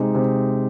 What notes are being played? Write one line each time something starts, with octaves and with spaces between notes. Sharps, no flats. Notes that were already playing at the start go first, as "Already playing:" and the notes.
Already playing: C3 G#3 D#4
C3